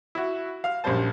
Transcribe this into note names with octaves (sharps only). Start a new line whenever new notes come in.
E4 F#4
F5 F6
A#1 F#2 G3 C5 A5